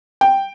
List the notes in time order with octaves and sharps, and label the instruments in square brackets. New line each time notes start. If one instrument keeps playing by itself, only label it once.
[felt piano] G5